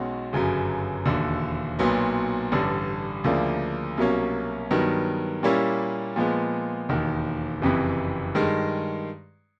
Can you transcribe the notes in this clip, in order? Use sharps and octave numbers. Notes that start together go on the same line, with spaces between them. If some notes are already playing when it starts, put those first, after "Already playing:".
Already playing: B1 B2 G#3 C#4 F#4
G1 F#2 C#3 F#3
E1 D#2 D3
B1 A#2 F#3 B3
A1 G2 D3
D2 C#3 F3 A#3 D4
C2 B2 F#3 A#3 C#4
G2 D#3 F#3 B3
A#2 G3 A#3 C#4 E4
A#2 F3 G#3 B3
E1 D#2 D#3
F#1 F2 C3 E3
G2 D#3 G#3